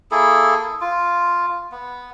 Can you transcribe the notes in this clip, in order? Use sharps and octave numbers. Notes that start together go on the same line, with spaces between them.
A#3 E4 G#4 A4
F4
B3